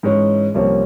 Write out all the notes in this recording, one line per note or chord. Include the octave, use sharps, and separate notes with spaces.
G#2 E3 G#3 C#4
C2 C3 F3 A#3 C#4